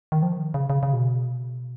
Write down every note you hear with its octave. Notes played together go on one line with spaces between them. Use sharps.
D#3
F3
D#3
C#3
C#3
C#3
B2